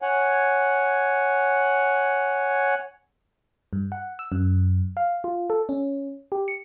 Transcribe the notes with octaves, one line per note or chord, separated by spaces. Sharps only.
C#5 F#5 G#5
G2
F#5
E6
F#2
F5
F4
A4
C#4
G4
C#7